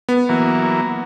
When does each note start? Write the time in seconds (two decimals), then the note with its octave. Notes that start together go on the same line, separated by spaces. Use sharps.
0.09 B3
0.29 E3 F#3 A#3